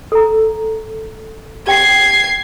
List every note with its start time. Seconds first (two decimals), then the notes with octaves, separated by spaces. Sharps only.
0.12 A4 A#5
1.67 G4 F#5 G5 G#6 C7